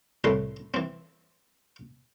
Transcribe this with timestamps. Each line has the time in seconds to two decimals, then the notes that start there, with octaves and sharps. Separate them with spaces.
0.24 C2 A2 A3 B4 C6
0.74 E3 C4